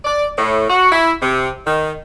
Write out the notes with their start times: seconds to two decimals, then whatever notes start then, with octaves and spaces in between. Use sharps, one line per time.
0.05 D5
0.37 A2
0.69 F#4
0.92 E4
1.22 C3
1.65 D#3